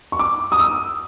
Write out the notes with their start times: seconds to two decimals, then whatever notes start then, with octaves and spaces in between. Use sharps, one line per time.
0.12 C#6
0.19 D6
0.52 D#6
0.60 E6